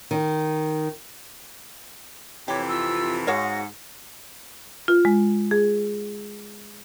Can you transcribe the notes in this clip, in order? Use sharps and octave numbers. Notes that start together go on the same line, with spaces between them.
D#3
F2 C3 E3 G4 C#5
F4 E6
G#2 F#4 C#5 F5 F#5 A#6
F4
G#3
G#4